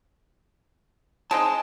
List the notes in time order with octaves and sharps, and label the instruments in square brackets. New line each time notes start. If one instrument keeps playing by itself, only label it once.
[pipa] G#3 C4 D#4 [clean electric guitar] A5